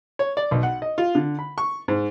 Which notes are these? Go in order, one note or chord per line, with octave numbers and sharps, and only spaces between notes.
C#5
D5
B1
F#5
D#5
F4
D3
B5
C#6
G#2